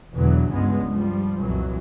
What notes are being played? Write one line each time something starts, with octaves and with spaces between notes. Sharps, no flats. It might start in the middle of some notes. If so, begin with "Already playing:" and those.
E2 B2 D3 E3 F#3
C#2 G2 C#3 G#3 B3
F3 G3
C2 F2 A#2 E3 F#3